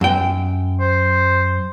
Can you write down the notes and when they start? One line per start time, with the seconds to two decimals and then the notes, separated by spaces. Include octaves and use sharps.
0.01 F#2 G5
0.80 C5